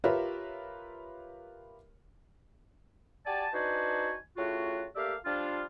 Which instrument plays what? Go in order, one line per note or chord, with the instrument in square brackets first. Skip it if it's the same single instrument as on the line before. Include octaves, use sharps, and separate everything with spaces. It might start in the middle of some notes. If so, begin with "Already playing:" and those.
[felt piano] F4 G4 A#4 B4 C#5 E5
[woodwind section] F#4 G4 D5 G#5 A5
D4 D#4 F#4 B4 C5 G#5
A2 C#3 F4 F#4
A3 A#3 G4 D5 E5 F5
F3 G3 D4 F4